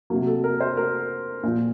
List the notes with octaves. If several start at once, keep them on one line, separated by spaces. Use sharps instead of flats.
C3 F#3 A#3
A4
A#4
C5
A#4
A#2 F3